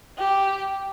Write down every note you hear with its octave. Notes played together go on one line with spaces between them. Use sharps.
G4